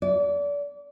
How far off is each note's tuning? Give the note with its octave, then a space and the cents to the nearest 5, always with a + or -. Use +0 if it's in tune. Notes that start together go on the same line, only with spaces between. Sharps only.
D5 -30